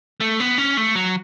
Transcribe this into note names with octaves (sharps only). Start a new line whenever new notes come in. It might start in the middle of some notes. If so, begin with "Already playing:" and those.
A3
B3
C#4
A3
F#3